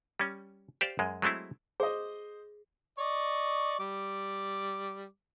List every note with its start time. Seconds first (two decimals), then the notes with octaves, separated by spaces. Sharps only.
0.20 G3 C#4
0.81 G4 C5 D5 F5
0.99 F#2 G#3
1.22 F#3 G#3 A3 C4 E4
1.80 G#4 C5 D#5
2.99 D5 D#5 C#6
3.79 G3 D6